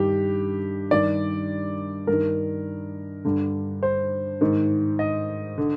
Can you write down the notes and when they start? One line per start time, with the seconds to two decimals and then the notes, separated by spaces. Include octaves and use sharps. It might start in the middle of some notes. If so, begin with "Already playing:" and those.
Already playing: G2 D#3 G4
0.91 G2 D#3 D5
2.07 G2 D#3 A#4
3.25 G2 D3
3.83 C5
4.41 G#2 D#3
4.99 D#5
5.58 D3